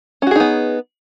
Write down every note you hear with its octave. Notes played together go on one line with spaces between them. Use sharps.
B3 C#4 D#4 F#4 G#4